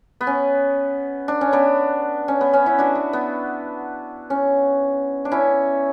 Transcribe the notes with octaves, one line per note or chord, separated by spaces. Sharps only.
B3
C#4
D4
C#4
B3 D4
C#4
B3
C#4
C#4 E4
D4 F#4
B3
B3
C#4
D4
C#4 E4